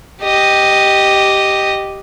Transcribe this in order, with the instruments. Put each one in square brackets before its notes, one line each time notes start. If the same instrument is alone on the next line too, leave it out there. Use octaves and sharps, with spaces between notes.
[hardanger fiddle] G4 D#5